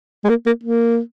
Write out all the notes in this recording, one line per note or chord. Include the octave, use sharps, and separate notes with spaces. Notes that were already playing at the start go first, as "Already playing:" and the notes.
G#3
A#3
A#3
A#3